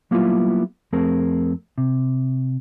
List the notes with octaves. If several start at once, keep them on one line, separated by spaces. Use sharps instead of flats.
F#3 G3 A#3 B3 E4 F4
F2 A3 C4 G#4 A#4
C3